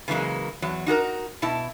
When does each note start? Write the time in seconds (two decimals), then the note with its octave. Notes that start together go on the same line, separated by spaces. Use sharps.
0.08 C#3 E3 F#3 G#3 A#3
0.62 E2 F#3
0.86 D#4 F#4 G#4 A#4
1.42 B2 E4 A5